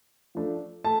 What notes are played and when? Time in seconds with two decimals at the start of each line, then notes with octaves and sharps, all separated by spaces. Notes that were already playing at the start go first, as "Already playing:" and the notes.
0.35 F3 A3 D4
0.84 A3 A5